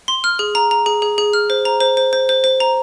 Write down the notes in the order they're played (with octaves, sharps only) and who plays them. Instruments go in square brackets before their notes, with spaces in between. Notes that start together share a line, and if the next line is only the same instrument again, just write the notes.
[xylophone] C6
F6
G#4
A#5
A#5
G#4
G#4
G#4
F6
C5
A#5
C5
C5
C5
C5
C5
A#5